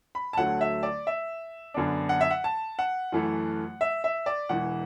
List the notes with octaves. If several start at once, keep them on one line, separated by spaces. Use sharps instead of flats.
B5
A5
D2 D3 F#3 A3 F#5
E5
D5
E5
F#2 D3 B3 D4
F#5
E5
F#5
A5
F#5
F#2 E3 A3
E5
E5
D5
E1 E2 E3 F#5